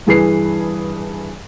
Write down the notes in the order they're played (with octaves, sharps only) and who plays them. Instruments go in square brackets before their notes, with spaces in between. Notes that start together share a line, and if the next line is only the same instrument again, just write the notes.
[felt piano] G2 E3 G#4 B4 C7